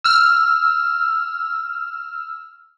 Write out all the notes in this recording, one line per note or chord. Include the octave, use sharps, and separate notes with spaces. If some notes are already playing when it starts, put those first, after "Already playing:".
E6 F6